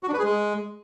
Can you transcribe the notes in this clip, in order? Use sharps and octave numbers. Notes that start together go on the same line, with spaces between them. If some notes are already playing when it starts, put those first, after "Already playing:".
F#4
D4
B4
G#4
G#3